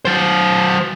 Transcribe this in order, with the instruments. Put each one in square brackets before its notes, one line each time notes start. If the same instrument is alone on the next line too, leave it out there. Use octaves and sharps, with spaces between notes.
[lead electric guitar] F#3 C5